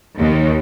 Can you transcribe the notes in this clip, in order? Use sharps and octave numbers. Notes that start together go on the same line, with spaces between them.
D#2